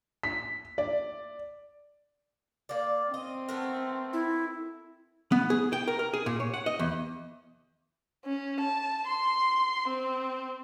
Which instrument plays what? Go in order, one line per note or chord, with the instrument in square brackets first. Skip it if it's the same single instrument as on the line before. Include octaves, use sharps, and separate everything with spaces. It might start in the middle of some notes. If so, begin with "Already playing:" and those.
[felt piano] B6
D5
[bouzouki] A#3 D5
[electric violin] C4 [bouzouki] D#5
[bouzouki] A3 B3 A#4
[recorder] E4
[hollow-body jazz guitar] B3
G#4
G5
A#4
A#4
G#4
A#2
C#5
F#5
D#5
E2
[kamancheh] C#4
A5
C6
C4